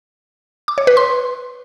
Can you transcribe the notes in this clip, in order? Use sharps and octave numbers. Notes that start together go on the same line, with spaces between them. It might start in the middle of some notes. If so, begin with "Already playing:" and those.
D6
C#5
B4
C6